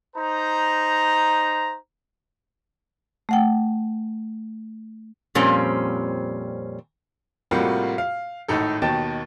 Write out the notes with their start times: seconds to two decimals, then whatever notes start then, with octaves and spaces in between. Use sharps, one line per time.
0.16 D#4 C5 A#5
3.29 A3 F#5 G5
5.35 F2 A#2 G3 C4 C#4
7.51 A2 C3 G3 A#3 F4 F#4
7.98 F5
8.48 G#1 A2 D#4 A4
8.82 D#2 B2 D#3 G5 A5 A6